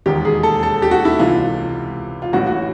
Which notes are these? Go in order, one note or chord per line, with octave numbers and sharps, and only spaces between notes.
E1 D#2 D#3 G4
G#4
A4
A4
G4
F#4
E4
C#2 C3 E3 F4
F4
A1 A2 E3 F#4
F#4